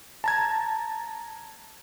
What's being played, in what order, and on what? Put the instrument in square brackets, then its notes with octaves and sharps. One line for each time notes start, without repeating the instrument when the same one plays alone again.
[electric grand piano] A5 A#5 G#6